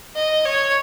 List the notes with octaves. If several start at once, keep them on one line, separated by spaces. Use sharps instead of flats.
D#5
C#5